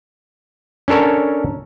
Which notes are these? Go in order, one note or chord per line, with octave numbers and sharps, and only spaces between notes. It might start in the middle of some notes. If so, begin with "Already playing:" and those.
C#4 D4 A4 A#4 C#5